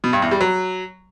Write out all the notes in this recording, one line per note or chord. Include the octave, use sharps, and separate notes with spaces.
B2
G2
E2
G3
F#3